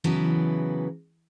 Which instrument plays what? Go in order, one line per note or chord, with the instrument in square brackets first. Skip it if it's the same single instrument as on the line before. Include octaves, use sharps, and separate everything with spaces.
[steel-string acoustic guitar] C#3 E3 F#3 B3 E4 A4